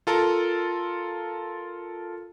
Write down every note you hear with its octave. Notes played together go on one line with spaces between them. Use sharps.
F4 A4 A#4